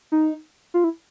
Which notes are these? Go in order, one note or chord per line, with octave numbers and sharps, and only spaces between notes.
D#4
F4
E4